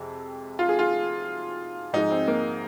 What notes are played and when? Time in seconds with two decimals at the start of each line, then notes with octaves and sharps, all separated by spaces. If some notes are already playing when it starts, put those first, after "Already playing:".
Already playing: F2 C3 G#3
0.59 F4
0.69 G#4
0.79 F4
1.93 G#2 F3 G#3 D#4
2.11 C4
2.28 A#3